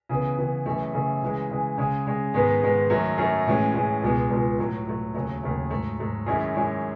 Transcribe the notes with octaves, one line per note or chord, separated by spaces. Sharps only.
C#3 E3 B3
C#3 E3 B3
F#2 C#3 E3 A3
F#2 C#3 E3 A3
C#3 E3 G#3
C#3 E3 G#3
C#3 G#3 C#4
C#3 G#3 C#4
G#2 D#3 G#3 B3
G#2 D#3 G#3 B3
F#2 D#3 F#3 A3
F#2 D#3 F#3 A3
A2 E3 G#3 C#4
A2 E3 G#3 C#4
C#2 B2 G#3
C#2 B2 G#3
A2 F#3 A3
A2 F#3 A3
D#2 C#3 F#3 A3
D#2 C#3 F#3 A3
G#2 F#3 A3
G#2 F#3 A3
F#2 D#3 G#3 C#4 E4
F#2 D#3 G#3 C#4 E4